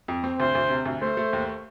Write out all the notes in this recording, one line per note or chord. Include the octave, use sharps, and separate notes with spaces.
F2
C4
D2 C5
D2
C3
D2
A3 C5
A3
D#2